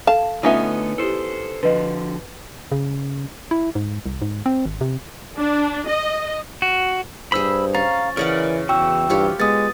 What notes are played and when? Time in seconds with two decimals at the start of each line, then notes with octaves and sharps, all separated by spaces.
0.07 A4 F5 A5
0.43 D3 A3 B3 C#4 D#4 F4 A4 E5
0.98 E4 G4 A4 C5
1.63 D3 F3 F#4 B4 D#5
2.72 C#3
3.51 E4
3.75 G#2
4.06 C2
4.22 G#2
4.46 C4
4.65 G#1
4.81 C3
5.36 D4
5.86 D#5
6.62 F#4
7.32 G2 G#4 C5 B5 E6
7.75 C#4 F5 A#5 A6
8.17 C#3 E3 A#4 C#5 D5 F#5
8.69 E2 E3 F#4 G5 E6
9.10 G2 F4 G4 C#5
9.40 G#3 B3 D#6 A6